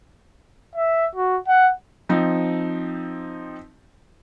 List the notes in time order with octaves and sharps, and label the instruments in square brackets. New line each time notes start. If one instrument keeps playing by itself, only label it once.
[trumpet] E5
F#4
F#5
[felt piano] F3 C4 D#4